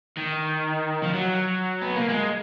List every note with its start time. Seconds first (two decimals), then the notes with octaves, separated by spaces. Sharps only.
0.18 D#3
1.03 F3
1.13 F#3
1.82 B3
1.95 A#3
2.09 G#3